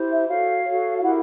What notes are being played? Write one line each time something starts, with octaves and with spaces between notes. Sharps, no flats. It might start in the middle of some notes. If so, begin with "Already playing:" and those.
Already playing: E4 G4 C5
E5
F#4 A4 C#5 F5
F#4 A4 C#5
F5
E4 G4 A#4 F#5